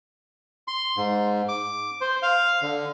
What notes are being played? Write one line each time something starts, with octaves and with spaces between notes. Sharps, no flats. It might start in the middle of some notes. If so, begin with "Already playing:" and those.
C6
G#2
D6
C5
F5
D3